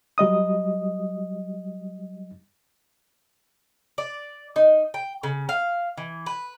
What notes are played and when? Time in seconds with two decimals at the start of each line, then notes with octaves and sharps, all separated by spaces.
0.18 F#3 G3 D#5 D#6
3.98 D5
4.56 D#4
4.94 G5
5.23 C#3
5.49 F5
5.97 E3
6.26 B4